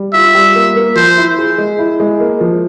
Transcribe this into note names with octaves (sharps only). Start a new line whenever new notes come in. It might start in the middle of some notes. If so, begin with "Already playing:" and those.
Already playing: G3
F4 E5
G3
A#3
A#3
F3 C5
E4
G#4
G#3
E4
G#3
A#3
F3